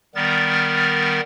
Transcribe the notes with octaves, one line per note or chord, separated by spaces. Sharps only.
D#3 G3 B3 A#4 A6